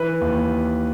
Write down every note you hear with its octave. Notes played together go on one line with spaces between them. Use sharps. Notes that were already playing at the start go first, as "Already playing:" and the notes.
Already playing: E3 B4
D#2